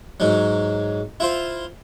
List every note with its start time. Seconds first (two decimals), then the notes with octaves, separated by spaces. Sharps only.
0.20 G#2 F#3
1.20 E4 F4 C5